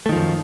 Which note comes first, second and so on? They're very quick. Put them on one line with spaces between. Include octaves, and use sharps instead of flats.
A3 D#3 F3 F#2